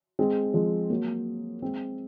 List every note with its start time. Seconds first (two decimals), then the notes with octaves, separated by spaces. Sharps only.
0.19 G#3 C4
0.54 F3 G#3
0.90 F#3 A#3
1.62 G#3 C4